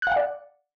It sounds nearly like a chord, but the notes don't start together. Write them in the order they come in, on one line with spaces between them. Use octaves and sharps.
F#6 F5 F#5 D5